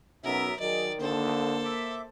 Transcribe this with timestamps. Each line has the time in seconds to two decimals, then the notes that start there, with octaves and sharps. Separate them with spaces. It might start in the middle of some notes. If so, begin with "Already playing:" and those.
0.24 B1 B2 F#3 B3 C#4 A#4 E5
0.60 D#3 F#3 G#4 A#4 D5 D#5
1.01 D3 A#3 A4 C5
1.65 E5 D6